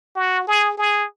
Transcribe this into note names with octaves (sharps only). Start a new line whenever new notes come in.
F#4
G#4
G#4